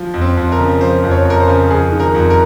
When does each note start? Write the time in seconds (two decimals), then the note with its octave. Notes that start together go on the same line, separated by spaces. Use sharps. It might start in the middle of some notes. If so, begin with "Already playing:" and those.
Already playing: F3
0.14 F2
0.21 C4
0.37 F2
0.52 A#4
0.59 C#3
0.80 F3 C5
1.03 F2
1.11 C#5
1.25 F2 A#4
1.40 C5
1.47 C#3
1.70 F2 G#4
1.92 D#3
2.00 A#4
2.14 F2
2.30 A#4